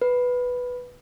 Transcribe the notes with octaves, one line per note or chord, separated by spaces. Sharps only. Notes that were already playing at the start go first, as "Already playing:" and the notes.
B4